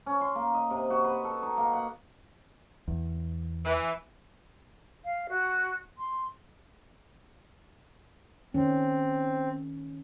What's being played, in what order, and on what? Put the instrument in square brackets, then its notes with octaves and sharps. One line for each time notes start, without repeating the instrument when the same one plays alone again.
[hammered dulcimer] C#4
C6
A#3
D#5
C3
F#4
B4
A4
D#4
A#3
F#5
[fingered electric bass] E2
[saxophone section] E3
[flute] F5
F#4
C6
[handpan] D#3 C#4 [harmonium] C4